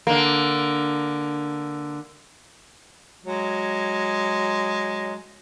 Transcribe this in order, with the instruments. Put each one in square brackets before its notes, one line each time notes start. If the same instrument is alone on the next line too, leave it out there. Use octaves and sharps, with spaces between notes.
[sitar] D3 A#3
[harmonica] F#3 G#3